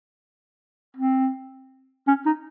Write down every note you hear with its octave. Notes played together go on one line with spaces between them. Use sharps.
C4
C#4
D#4